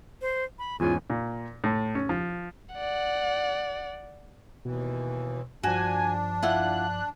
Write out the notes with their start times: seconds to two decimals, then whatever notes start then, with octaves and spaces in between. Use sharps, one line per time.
0.21 C5
0.59 B5
0.80 E2 G#2 C#4 F4 G#5
1.10 A#2
1.64 A2
1.95 C#4
2.09 F3
2.75 D5 F#5
4.65 D#2 B2 E3
5.63 G2 F3 D4 F#4 G#5
6.43 E4 F4 F#5 F#6